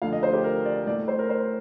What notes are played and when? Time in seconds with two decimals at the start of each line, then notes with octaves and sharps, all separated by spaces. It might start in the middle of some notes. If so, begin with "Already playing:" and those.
0.02 D2 D3 F3 A3 F5
0.12 D#5
0.23 C5
0.33 G4
0.44 A#4
0.65 D5
0.86 A2 A3 D5
1.08 C5
1.19 A#4
1.29 C5